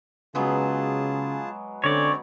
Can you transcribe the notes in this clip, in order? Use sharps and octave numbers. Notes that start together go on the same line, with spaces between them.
C#3 F#3 G#3 B3 F4 G#4 A5
D3 C4 C#4 C#5 D5